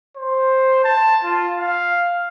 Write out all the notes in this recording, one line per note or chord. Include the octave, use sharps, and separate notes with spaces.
C5
A5
F4
F5